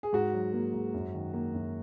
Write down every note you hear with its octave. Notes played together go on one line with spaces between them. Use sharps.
G#4
G#2 F#4
F#3
A#3
G#2
F#2
D#3
A#3
F#2